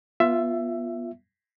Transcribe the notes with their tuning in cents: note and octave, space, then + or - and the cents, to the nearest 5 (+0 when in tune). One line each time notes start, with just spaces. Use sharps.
B3 -20 F4 +0 E5 +15